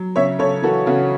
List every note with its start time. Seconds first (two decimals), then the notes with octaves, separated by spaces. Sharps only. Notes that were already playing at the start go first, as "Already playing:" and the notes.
Already playing: F#3
0.16 C#3 C#5 E5
0.39 C#3 A4 C#5
0.62 E3 F#4 A4
0.86 C#3 F#4 A4